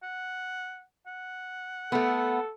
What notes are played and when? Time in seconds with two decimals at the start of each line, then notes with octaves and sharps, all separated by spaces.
0.03 F#5
1.07 F#5
1.92 A3 B3 A4